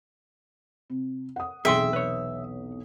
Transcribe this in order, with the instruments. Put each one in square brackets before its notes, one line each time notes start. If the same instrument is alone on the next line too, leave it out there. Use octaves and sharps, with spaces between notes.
[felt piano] C3
F#5 D#6
[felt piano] B1 E2 C3 [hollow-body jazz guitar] G#4 G5 C6 [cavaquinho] E5
[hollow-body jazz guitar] B4 C#5